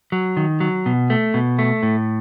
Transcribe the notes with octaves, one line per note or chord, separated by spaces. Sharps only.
F#3
D#3
F#3
B2
A3
B2
A3
A2